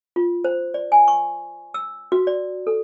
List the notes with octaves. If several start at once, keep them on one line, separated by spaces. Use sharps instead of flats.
F4
C5
D5
G#5
C#6
E6
F#4
D5
A4